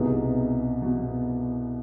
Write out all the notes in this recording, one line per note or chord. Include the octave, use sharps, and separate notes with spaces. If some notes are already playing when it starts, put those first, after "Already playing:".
Already playing: C2 B2 B3 D#4 G#4
B2